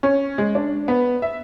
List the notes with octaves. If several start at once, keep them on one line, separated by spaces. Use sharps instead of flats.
C#4
G#3
D4
B3
E5